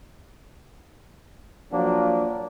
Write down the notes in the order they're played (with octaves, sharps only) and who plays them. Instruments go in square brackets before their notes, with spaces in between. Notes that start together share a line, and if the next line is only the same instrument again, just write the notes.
[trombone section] F3 F#3 A#3 D4 F#4